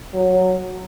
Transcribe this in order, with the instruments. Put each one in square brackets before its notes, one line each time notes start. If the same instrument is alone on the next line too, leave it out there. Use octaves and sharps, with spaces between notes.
[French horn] F#3